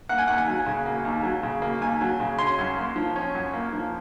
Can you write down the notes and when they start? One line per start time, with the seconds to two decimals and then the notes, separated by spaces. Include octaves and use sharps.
0.09 A#3 F#5
0.18 G#5
0.27 D#2 F#5
0.38 G#5
0.47 F#3
0.66 C#3
0.86 A#3
1.05 D#2
1.23 F#3
1.43 C#3
1.62 A#3
1.81 D#2 G#5
2.01 F#3
2.20 C#3
2.39 C#4 C6
2.59 F#2
2.77 A#3
2.96 F3
3.16 C#4
3.35 F#2
3.53 A#3
3.73 F3